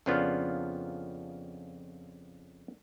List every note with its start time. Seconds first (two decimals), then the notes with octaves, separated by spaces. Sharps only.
0.06 F2 C#3 F3 B3 D4 F4